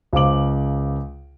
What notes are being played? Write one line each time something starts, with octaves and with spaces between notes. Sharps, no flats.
C#2 C#3 C5 F5 D6 F#7